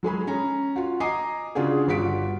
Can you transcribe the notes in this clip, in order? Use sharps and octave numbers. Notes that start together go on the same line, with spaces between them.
F#3 G#3 G#4 B5
C#4 A#5
F4 F#4
D#5 G#5 A#5 D6 C7
C#3 D4 F4 F#4 G#4
G1 G2 F4 F#4 B6 D7